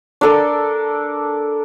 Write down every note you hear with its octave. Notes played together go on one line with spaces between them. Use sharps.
D4 A4 A#4